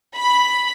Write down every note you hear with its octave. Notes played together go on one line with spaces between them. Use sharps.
B5